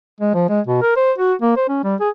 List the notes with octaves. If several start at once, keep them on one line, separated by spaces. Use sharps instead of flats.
G#3
F3
G#3
B2
A#4
C5
F#4
A#3
C5
C#4
G3
G#4